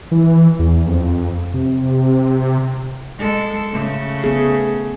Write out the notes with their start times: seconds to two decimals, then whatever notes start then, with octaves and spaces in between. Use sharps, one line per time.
0.11 E3
0.59 E2
0.87 F2
1.54 C3
3.18 G#3 A4
3.72 C#3 A3
4.24 B3 G#4